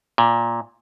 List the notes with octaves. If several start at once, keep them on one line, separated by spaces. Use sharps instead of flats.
A#2